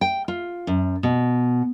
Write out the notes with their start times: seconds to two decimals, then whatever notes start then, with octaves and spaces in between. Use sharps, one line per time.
0.01 G5
0.28 F4
0.67 F#2
1.03 B2